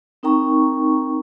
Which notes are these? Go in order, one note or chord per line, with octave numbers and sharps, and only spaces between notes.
C4 D#4 A#4 G5 A#5 C#6